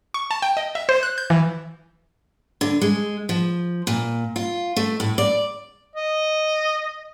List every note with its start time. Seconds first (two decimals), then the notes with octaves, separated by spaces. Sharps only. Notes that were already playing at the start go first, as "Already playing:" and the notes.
0.14 C#6
0.31 A5
0.42 G5
0.57 D#5
0.75 E5
0.89 C5
1.03 F#6
1.18 G6
1.30 E3
2.61 D3
2.81 G#3
3.29 F3
3.87 A#2
4.36 F4
4.77 A3
5.00 A2
5.18 D5
5.96 D#5